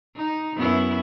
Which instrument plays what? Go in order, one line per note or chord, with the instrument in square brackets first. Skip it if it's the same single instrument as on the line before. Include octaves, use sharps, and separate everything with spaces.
[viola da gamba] D#4
F#2 B3 E4